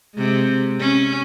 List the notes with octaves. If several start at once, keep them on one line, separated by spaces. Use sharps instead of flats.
C3 G#3
C#4